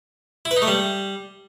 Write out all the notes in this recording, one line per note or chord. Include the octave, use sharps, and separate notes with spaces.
E4
B4
D#4
A3
G3